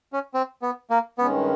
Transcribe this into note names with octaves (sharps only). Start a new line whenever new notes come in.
C#4
C4
B3
A#3
G2 D#3 G#3 B3 C#4